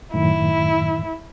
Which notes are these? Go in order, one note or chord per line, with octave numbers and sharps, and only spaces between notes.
F#2 A2 D#3 E4